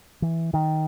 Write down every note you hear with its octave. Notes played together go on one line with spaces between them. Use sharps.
E3
D#3